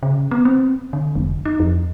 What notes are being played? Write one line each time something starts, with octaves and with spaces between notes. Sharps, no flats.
C#3
B3
C4
D3
F1
D#4
F2